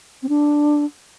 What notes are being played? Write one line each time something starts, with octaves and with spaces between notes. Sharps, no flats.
C4
D4